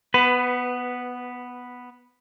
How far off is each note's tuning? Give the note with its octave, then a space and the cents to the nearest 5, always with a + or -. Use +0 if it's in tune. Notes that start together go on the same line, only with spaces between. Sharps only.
B3 +0 B4 +20